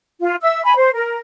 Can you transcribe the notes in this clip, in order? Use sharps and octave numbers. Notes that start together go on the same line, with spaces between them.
F4
E5 E6
G#5 B5
C5
A#4